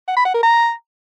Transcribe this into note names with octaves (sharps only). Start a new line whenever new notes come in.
F#5
B5
F#5
A#4
A#5